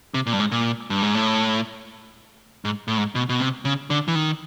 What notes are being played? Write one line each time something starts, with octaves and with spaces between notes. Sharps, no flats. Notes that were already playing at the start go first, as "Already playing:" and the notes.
C3
A#2
G2
G#2
A#2
G2
G#2
A2
G#2
A2
G#2
B2
B2
C3
C#3
D3
E3
D#3